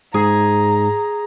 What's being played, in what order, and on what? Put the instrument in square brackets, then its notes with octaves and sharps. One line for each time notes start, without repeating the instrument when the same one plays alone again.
[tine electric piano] G#2 [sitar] G#4 [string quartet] A#5